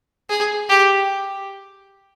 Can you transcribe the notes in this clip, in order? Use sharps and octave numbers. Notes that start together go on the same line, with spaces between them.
G#4
G4